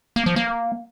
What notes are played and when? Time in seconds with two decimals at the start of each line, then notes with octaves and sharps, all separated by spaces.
0.16 A#3
0.26 F3
0.36 A#3